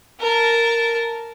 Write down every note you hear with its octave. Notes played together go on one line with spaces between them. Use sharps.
A#4 A5